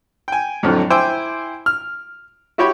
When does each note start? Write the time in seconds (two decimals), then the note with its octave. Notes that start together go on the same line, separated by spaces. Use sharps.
0.28 G5 G#5
0.63 F2 A2 D3 F3 F#3
0.90 E4 C5 G5 G#5 D6 E6
1.66 F6
2.58 E4 F#4 G4 C#5 G5 B5